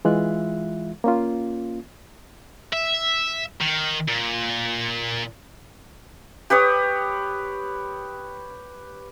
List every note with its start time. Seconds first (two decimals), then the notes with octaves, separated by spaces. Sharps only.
0.05 E3 G#3 F4 E5 F#6
1.04 A#3 C#4 F4
2.73 E5
3.61 D#3
4.08 A#2
6.50 G4 B4 C#5 D#6